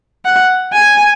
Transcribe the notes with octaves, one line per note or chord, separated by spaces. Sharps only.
F#5
G#5